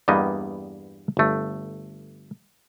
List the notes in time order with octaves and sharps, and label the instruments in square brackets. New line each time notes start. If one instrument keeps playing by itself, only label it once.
[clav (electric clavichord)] E2 G2 G3 A#3 B3 D#5
G1 A3